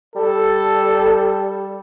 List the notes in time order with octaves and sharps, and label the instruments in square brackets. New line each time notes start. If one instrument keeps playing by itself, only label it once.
[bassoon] G3 [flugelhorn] A4